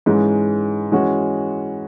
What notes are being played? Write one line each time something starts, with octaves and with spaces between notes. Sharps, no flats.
G#2 E3 G#3 C#4
E3 G#3 C#4 F#4